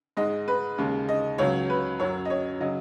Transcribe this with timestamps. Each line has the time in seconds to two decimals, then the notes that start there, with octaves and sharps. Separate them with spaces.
0.17 G#2 G#3 D#5
0.48 B4
0.78 D#2 C#3 G#3
1.09 D#5
1.38 C#2 C#3 F#3 C#5
1.70 B4
1.99 F#2 F#3 C#5
2.25 D#5
2.30 C#5
2.60 C#3 F#3 D#5